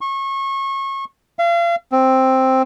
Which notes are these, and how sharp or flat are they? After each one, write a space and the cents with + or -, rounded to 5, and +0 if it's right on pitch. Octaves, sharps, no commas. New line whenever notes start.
C#6 -30
F5 -35
C4 +5